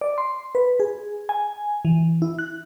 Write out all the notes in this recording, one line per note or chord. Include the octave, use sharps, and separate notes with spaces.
D5
C6
B4
G#4
G#5
E3
E4
F#6